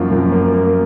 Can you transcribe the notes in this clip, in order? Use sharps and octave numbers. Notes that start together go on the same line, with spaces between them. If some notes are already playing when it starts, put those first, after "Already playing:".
Already playing: F#2 F3 A#3 F4
F#2
A#3
A#3